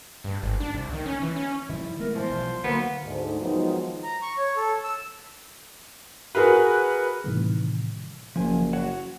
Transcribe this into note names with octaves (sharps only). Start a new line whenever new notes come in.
G2
G#1
D4
C2
D#3
C#4
E3
C#4
D#3 F3 G3 E4
G#3 A3 B3 A#4
E3 F3 G3 C5
B1
D3 D#3 F#3 A#3 B3
D2 G#2
D#3 F3 F#3 G#3 B3 D#4
A#5
C#6
C#5
A4
E6
F#4 G#4 A#4 B4
A2 C3 D#3 E3 G3
F#1 F3 G#5
F#4 C#5 F#5